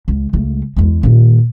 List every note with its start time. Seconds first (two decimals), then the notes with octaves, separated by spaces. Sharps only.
0.08 C#2
0.33 C#2 A3
0.76 E2 G#3
1.03 A#2 D#3